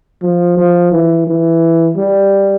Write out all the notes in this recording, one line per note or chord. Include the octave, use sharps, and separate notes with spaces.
F3
F3
E3
E3
G3